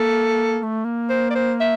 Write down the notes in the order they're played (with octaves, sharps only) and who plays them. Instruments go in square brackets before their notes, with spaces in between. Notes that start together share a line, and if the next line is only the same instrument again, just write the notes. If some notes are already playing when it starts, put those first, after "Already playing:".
Already playing: [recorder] A#3 [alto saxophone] A4
[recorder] A#3
A3
A#3
[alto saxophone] C5
D5
C5
E5